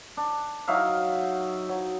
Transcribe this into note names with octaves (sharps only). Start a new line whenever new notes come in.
D4
F#3 D#4 E5 F5
F#3